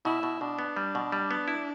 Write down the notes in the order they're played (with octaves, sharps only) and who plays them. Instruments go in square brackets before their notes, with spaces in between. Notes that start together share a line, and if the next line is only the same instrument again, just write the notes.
[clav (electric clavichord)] B2 [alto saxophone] E4
[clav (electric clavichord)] B2
[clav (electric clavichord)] B2 [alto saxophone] D4
[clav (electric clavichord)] B3
G3
B2
G3
B3
E4